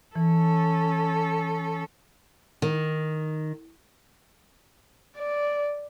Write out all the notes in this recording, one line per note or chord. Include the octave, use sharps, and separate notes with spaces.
E3 C#4 A4
D#3
D5